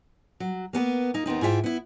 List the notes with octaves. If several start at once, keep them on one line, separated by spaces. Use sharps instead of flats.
F#3
A#3 B3 A4 B4
A#3 D#4
D#2 B3 C4 D#4
G#2 E4 F4 E5 G5
B3 E4